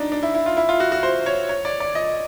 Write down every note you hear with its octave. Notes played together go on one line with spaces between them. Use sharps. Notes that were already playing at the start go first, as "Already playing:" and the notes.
Already playing: D4 D#4
D4
E4
E4
F4
E4
F4
F#4
F#4
C5
C#5
C#5
D5
D5
D#5